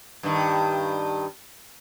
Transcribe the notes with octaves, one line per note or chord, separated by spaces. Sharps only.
G2 D#3